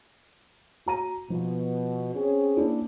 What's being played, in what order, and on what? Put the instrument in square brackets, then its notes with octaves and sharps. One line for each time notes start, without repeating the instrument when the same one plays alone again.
[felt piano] F#4 A#5 D#7
[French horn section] B2 [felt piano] F3
[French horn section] C4 C#4 G#4
[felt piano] A#3 D4 E4